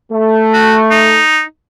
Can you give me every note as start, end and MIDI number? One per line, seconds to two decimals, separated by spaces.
0.12 1.21 57
0.54 0.76 66
0.91 1.42 63